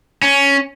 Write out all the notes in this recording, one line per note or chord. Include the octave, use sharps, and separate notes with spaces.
C#4